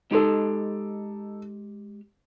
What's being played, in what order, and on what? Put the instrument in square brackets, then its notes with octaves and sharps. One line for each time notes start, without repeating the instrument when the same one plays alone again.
[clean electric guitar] G#3 G4 C6 [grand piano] D#4 A4